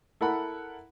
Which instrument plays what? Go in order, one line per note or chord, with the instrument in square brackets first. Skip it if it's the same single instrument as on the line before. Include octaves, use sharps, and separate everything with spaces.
[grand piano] E4 A4 A#4 F#5 B5